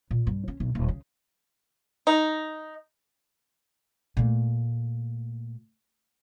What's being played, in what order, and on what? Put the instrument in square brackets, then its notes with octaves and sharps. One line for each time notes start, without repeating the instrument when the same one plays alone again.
[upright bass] A#2
G2
C#4
B1
D#1
C#3
[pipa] D#4
[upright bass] A#2 A3